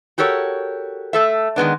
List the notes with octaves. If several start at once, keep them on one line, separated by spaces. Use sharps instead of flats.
F#4 G4 A4 A#4 C#5
A3 A4 E5
D#3 G#3 B3 D4